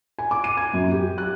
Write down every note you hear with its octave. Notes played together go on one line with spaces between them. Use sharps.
G#5
D6
D#7
G#6
F#2
G4
F#6